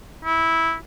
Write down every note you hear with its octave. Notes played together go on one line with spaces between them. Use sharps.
E4